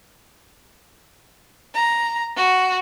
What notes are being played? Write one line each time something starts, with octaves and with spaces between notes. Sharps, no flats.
A#5
F#4